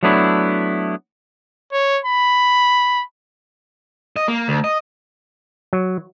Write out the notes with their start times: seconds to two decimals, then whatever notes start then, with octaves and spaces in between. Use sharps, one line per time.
0.03 F#3 A3 B3 D4 E4
1.72 C#5
2.05 B5
4.16 D#5
4.28 A#3
4.48 D2
4.64 D#5
5.73 F#3